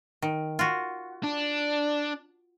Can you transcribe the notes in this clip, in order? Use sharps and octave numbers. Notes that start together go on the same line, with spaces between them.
D#3
F4 F#4
D4